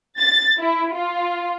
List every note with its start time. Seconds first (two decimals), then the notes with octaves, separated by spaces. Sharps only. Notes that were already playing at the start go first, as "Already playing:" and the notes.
0.19 A6
0.60 E4
0.95 F4